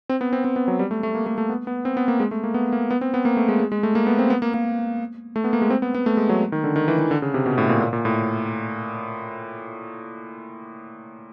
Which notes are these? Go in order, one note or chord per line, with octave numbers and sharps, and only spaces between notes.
C4
B3
C4
C4
B3
F#3
G3
A3
A3
A#3
A3
A3
B3
B3
C4
B3
A#3
G#3
A3
A#3
B3
A#3
B3
C4
B3
A#3
A3
G#3
G#3
G#3
A3
A#3
B3
C4
B3
A#3
A#3
A3
B3
A#3
G#3
C4
B3
B3
A3
G#3
F#3
D#3
D3
D#3
E3
E3
D3
C#3
C3
B2
A2
A#2
A#2
A#2
A2